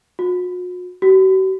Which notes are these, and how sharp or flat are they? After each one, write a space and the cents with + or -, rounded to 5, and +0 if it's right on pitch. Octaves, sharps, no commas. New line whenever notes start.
F#4 -45
F#4 +45